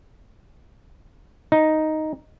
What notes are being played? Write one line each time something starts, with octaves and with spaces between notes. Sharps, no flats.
D#4